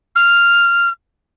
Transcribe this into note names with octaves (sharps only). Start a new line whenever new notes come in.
F6